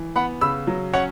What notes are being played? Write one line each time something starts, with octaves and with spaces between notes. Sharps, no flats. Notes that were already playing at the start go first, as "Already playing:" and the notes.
Already playing: E3
B3 F#5 B5
C#3 B5 E6
F#3
C#4 C#5 F#5